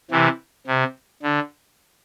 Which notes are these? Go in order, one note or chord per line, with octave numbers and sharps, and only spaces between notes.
C3 E3
C3
D3